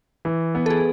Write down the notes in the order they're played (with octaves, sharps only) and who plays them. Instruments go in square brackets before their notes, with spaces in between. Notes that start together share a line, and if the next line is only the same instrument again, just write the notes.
[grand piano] E3
B3
[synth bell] A4
G#4